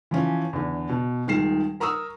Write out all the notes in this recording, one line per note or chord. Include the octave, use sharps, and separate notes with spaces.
E3 F3 C#4
E2 D3
B2
D#1 D#3 G#3 C7 E7
A#4 A#5 C#6 D#6 E6